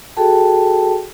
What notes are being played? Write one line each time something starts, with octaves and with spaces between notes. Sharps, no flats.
F#4 G#4 A4 G5 A5